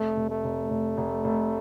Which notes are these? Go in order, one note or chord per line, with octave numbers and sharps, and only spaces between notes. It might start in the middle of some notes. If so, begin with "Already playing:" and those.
Already playing: F1 A3
F1
A3
F1
F1
F1
F1